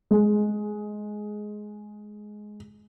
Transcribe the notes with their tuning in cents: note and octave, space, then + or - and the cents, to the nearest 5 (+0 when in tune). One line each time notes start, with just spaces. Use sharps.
G#3 +15